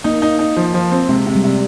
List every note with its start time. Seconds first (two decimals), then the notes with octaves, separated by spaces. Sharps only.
0.04 A#3 D#4
0.22 D#4
0.39 D#4
0.56 F3
0.74 F3
0.92 C4
1.09 C3 G#3
1.26 C3
1.36 G3
1.44 C3